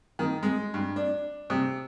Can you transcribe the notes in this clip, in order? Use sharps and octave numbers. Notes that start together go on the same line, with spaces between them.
D#3
G#3
G2
D4
C3